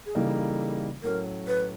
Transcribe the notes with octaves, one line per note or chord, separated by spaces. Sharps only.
G#4
C#3 E3 G3 A#3 D#4 A4
A2 F#3 A3 C#4 A#4
B4